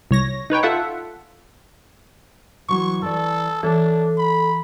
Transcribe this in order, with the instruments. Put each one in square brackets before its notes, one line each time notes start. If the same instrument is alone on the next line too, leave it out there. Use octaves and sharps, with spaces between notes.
[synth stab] C2 C#5 A#6
D#4 B4 C#5 G5
F4 A4 E5 F#5
[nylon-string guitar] E3 F#3 E4 [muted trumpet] C#6
[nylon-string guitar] E3 D5 [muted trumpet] A4
[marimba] E3 [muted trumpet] D4 [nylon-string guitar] A4 C#5
[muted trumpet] B5